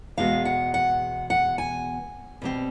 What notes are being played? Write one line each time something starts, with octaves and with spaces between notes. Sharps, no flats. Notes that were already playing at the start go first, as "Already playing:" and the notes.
E2 B2 G#3 B3 F5
F#5
F#5
F#5
G#5
B2 G3 C4